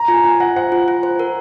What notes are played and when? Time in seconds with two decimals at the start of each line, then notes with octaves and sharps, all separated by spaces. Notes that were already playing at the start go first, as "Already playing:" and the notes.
Already playing: A#5
0.08 F4 G#5
0.17 A#5
0.24 F4 G#5
0.40 F4 F#5
0.56 C5 F#5
0.72 F4
0.88 F4
1.03 C5
1.19 A#4